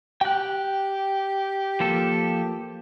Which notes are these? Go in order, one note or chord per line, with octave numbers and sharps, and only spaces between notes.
G4 G5 F#6
F3 A#3 A4